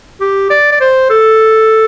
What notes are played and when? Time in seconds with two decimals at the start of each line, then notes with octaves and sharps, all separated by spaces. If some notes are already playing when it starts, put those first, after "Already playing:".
0.21 G4
0.50 D5
0.72 D5
0.81 C5
1.10 A4